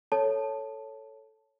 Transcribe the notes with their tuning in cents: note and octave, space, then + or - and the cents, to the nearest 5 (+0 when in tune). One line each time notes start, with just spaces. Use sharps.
A4 +0 C#5 +0 A5 +0